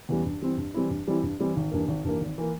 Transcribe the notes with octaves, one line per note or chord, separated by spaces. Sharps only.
E2 E3 G3 C#4
G2
E3 G3 C4 E4
G2
E3 G3 C4 E4
G2
E3 G3 C4 E4
G2
E3 G3 C4 E4
G#1
G2 E3 A#3
G#1
G2 E3 A#3
G#1
E3 A#3